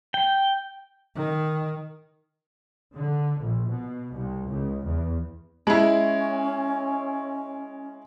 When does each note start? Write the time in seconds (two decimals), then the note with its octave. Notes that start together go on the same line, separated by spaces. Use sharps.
0.14 G5
1.16 D#3
2.94 D3
3.39 A#1
3.69 B2
4.12 C2
4.48 C#2
4.84 E2
5.67 G#3 C#4 E4